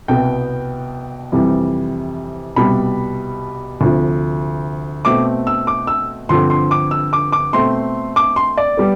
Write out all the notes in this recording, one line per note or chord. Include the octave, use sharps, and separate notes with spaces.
C2 B2 B3 G5
F2 C3 E3 G3
C2 B2 G3 B5
D2 C3 F3
B2 A3 C4 D6
E6
D6
E6
G2 D3 F3 C4 C6
C6
D6
E6
D6
D6
B2 A3 C4 C6
D6
C6
D5
G3 B3